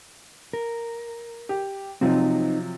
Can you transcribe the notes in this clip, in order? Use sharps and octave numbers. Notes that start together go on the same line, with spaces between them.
A#4
G4
C3 F3 F#3 C4 D#4